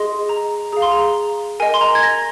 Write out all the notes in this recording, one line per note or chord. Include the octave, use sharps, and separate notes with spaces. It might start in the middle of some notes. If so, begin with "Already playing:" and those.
Already playing: G#4 D#5 C6
A#5
G#4 F5 A#5
C6
A#5
A#4 D#5 G#5
C6
A#5
G#6
A#6